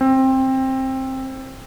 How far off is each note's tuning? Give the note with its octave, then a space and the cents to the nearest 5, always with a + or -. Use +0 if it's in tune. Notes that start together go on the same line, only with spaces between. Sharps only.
C4 +15